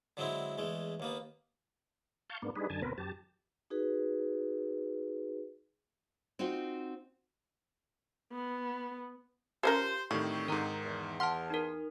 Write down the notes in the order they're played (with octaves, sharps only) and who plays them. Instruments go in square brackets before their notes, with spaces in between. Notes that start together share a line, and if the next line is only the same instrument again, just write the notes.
[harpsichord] D3 F#3 G#3 C4 E4
E2 G#3 A3
D#2 A#3 B3
[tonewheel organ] F5 A5 C#6 G6
G#2 A#3 B3 D4
G3 D4 D#4 G#4 B4
F#2 D3 G#5 A5
D2 B2 B3 C4 A#4 B4
F#2 G4 A5
[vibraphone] D#4 F#4 G#4 B4
[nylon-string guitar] C4 D#4 F4 F#4 C5
[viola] B3
[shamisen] F3 C#4 A#4 [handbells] G4 [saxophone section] C5
[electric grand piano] A2 D#3 [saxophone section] D3 C4 [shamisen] G3 [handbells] C#6
[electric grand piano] G#2 D#3 [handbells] A#4 A#5
[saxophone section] E2
[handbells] F#5 A5 [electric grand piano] C6 F6
[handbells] D#4 A#4